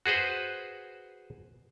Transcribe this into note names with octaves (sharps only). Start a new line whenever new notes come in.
F#4 G#4 B4 C5